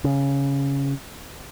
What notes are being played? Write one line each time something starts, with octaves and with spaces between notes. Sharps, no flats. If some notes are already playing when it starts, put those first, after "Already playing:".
C#3